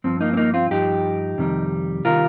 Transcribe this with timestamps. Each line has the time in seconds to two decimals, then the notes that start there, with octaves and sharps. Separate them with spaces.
0.04 G2 F3 C4
0.21 A#3 D#4
0.33 C4
0.37 A#3 D#4
0.54 C4 F4
0.71 G2 F3 D#4 G4
1.38 F2 C3 D#3 G3
2.05 C3 D#3 G3 F4 A#4